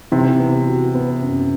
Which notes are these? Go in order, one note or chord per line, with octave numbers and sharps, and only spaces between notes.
C3 E3
B3
F#4
B3
F#2